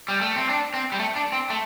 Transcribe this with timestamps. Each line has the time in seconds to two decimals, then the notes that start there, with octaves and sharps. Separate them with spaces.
0.08 G3
0.21 A3
0.36 C4
0.49 D4
0.74 C4
0.92 G3
1.00 A3
1.16 D4
1.32 C4
1.50 A3